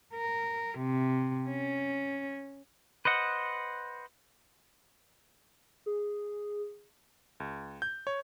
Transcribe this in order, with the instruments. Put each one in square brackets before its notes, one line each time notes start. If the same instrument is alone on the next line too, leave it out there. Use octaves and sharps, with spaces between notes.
[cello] A#4
C3
C#4
[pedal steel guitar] B4 C5 D#5 F#5
[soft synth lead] G#4
[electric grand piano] C#2
G6
C#5